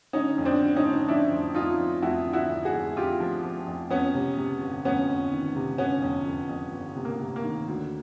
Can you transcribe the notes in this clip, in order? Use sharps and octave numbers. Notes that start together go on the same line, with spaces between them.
D3 C#4 D#4
F2
C4 D4
D3
C#4 D#4
D3
F3 D4 E4
F2
F2 D#4 F4
F3
F2 E4 F#4
D3
E4 F#4
F2
F#4 G#4
F2
F2 F4 G4
F3
F3
F2
F2 B3 C#4
C3
C3
G1
F2 B3 C#4
F2
D#3
C3
G1 B3 C#4
F2
F2
F2
G1
C3
A#3
C3
A#3
D#3
D2